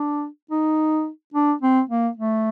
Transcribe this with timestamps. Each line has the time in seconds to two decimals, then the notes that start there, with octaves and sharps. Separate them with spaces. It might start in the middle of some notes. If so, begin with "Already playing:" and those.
Already playing: D4
0.51 D#4
1.34 D4
1.62 C4
1.89 A#3
2.17 A3